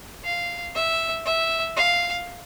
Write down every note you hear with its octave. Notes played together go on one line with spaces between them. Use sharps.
F5
E5
E5
F5